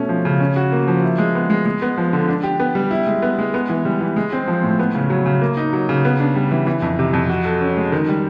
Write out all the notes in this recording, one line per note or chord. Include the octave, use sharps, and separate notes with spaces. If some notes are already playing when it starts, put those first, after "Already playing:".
Already playing: B2 A3 C#4
F3
C#3
C#4
F#4
A#3
F3
E4
G#3
B3
G#3
G#3
B3
F3
D3
D4
G4
B3
G3
E4
G#3
B3
G#3
B3
E3
G3
E3
G#3
C4
F3
A2
B3
C#3
F#3
C#3
A#3
D#4
F#3
C#3
B3
D4
G3
E3
E3
F2
C3
F2
F#4
A4
C#4
G#3
D#3
G3